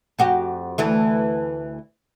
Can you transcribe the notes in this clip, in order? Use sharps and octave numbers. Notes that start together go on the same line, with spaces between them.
F2 F#4 G4
D2 E3 A3